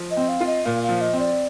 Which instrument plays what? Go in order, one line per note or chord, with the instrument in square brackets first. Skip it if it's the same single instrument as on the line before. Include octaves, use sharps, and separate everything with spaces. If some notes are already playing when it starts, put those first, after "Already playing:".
Already playing: [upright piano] F3
[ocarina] D#5
[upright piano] C4
[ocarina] F5
[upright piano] F4
[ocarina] D#5
[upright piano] A#2 [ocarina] F5
[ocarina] F5
[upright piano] F3
[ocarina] D#5
[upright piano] C4
[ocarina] D5